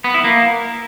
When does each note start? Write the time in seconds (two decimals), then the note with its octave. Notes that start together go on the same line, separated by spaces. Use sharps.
0.04 B3
0.14 E4
0.24 A#3